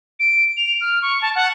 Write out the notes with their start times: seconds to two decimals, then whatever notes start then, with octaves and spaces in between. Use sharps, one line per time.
0.20 D7
0.57 F7
0.81 F6
1.02 C#6
1.22 A5
1.35 F#5